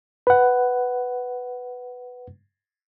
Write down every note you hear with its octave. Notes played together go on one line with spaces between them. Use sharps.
B4 F#5